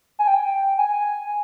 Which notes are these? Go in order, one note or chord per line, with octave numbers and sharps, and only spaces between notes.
G#5
G5
G#5